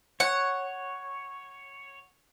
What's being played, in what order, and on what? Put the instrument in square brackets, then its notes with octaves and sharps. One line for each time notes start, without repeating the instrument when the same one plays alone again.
[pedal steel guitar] C#5 [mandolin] F#5